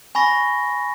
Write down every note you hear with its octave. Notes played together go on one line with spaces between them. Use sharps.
G#5 B5 C#6 A#6